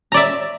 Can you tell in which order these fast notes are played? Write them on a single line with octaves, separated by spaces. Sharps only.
A#5 D5 E5